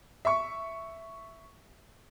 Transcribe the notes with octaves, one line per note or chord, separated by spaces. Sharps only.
E5 C#6